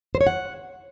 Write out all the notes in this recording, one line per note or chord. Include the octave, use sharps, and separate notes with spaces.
C5
C#5
F#5